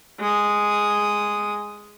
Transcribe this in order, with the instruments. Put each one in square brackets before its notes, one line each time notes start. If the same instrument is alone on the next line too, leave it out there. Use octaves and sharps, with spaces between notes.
[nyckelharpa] G#3 D#6